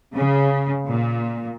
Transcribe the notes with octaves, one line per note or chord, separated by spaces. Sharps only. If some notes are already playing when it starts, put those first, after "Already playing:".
C#3
A#2